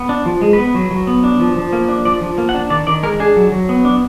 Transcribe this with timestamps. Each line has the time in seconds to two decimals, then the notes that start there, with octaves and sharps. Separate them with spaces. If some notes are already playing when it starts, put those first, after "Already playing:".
Already playing: B3
0.09 D4
0.26 F3
0.42 G#3
0.53 B4
0.58 B3
0.75 F#3
0.91 F#3
1.07 B3
1.24 D4
1.40 F3
1.56 F3
1.73 A#3
1.89 D4
2.05 F3 D5
2.22 F3
2.38 A#3
2.49 F#5
2.54 D4
2.70 D#3 D5
2.87 D#3 D5
3.03 G#3 A#4
3.20 D4 G#4
3.36 F#3
3.52 F#3
3.69 B3
3.85 D4